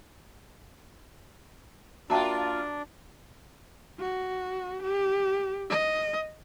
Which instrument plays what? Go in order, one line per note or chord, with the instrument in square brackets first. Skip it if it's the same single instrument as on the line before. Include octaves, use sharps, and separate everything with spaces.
[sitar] A#3 F4 [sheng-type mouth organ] D4 [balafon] F#4 E5 G5 [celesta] A5 A#5
[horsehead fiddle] F#4
G4
D#5